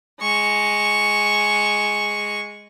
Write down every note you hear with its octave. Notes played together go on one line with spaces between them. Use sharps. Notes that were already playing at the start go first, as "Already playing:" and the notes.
G#3 C#6